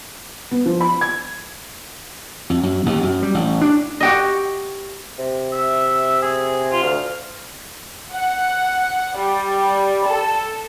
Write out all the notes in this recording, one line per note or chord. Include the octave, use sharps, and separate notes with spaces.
B3
F3
B5
G#6
F2
F#2
D#2
F#2
G3
A1
D4
F#4 G4 D#5
C3
E5
G#4
F4
D2 F5
F#5
G3
A4